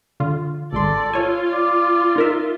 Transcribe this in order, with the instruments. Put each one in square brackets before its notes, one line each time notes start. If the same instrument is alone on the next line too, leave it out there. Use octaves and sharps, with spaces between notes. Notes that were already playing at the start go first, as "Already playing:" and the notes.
[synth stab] D3 F4
[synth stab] G#1 C6 [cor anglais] A4 [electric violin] D5
[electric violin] F4 [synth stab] C#5 G#5
[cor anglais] D5
[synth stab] D#4 A#4 E5